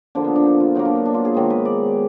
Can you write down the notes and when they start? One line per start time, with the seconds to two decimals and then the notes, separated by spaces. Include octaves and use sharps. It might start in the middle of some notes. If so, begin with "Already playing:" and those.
0.15 D3 F3 A#3 D4
0.24 B3
0.36 D4
0.46 D#4
0.60 F4
0.75 B2 F#3 A#3 D#4
0.85 D4
0.95 B3
1.05 D4
1.14 F4
1.25 G#4
1.35 G#2 D#3 F#3
1.50 B4
1.65 D5